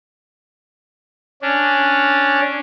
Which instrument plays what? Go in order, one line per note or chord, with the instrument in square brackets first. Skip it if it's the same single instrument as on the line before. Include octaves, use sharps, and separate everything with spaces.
[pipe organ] C#4 D4